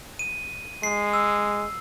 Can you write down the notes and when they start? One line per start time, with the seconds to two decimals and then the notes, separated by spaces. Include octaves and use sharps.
0.19 D#7
0.83 G#3 C7
1.13 E6